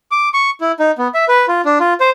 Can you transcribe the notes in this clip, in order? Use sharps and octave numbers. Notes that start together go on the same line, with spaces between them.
D6
C#6
E4
D#4
B3
E5
B4
F4
D4
F4
C5